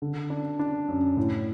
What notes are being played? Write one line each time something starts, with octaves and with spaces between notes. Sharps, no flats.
D3
D4
D4
F#2
A2